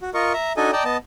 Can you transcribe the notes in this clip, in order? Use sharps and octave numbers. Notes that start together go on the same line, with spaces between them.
F#4
F4 A#4 D#5 C#6
E5 A#5
D4 D#4 F#4 A4 D#5 G#5
D5 D#5 G5 A5 A#5
B3 D#5 A5